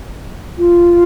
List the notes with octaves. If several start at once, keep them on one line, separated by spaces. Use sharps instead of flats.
F4